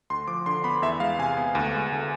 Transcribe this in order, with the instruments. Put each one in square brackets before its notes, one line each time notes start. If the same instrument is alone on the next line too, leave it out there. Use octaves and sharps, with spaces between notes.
[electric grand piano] D2 C6
F3 D6
D3 C6
B3 B5
E2 E5
G#3 F5
C3 G#5
B3
D2
G#3
D3